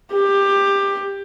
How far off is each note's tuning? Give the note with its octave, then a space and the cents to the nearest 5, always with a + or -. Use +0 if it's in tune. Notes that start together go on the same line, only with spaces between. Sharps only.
G4 +15